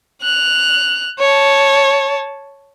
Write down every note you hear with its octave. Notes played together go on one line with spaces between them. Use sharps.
F#6 F7
C#5 A5